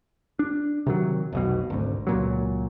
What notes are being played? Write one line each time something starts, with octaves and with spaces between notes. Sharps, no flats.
D4
C3 D#3 F#3
F1 B1 B2
G#1 D2
C#2 A#2 F#3